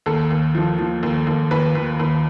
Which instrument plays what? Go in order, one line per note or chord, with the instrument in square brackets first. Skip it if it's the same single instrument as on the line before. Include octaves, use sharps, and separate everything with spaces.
[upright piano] D#2 A4
D#2
F3
F3
D#2
D#2
D#2 B4
D#2
D#2